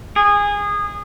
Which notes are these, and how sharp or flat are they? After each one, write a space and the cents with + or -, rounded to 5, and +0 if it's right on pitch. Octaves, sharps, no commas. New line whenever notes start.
G#4 -20